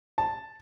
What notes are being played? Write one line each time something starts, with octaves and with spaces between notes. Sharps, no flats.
A5